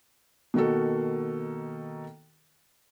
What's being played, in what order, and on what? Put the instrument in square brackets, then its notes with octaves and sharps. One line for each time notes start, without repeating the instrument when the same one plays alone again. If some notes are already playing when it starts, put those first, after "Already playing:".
[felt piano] B2 D#3 A#3 F#4 A4